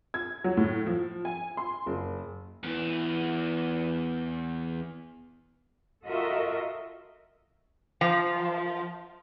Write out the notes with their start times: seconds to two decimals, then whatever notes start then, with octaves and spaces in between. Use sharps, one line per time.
0.14 G#6
0.44 F#3
0.57 A2
0.86 F3
1.25 G#5
1.57 C6
1.86 F#1
2.64 E2 E3
6.07 F4 F#4 A4 A#4 D#5 E5
8.01 F3